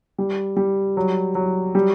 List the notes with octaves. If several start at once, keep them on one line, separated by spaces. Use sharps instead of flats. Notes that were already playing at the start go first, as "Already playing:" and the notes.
G3
G3
F#3
F#3
G3